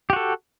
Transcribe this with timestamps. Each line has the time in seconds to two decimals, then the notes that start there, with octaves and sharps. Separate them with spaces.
0.10 G4
0.13 F#4
0.16 A4